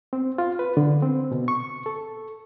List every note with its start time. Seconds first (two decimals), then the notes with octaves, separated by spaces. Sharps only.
0.13 C4
0.38 F4
0.59 B4
0.77 D3
1.03 C4
1.32 B2
1.48 C#6
1.86 A4